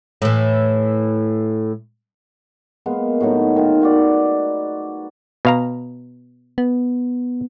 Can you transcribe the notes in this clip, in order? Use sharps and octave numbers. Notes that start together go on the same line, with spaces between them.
A2 E3
G#3 A#3 B3
A2 F#3 D#4
D#3 F4
D#4 F#4 D5
B2 F5 A#5
B3